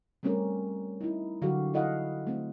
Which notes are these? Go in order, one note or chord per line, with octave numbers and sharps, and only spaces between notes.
G3 A3 C4 C#4 G4 A#4
D#4 E4
D3 F#3 F#4 G4 F5
E4 A4 D#5 F5 F#5
A3 C4